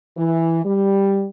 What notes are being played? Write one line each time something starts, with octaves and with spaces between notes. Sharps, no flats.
E3
G3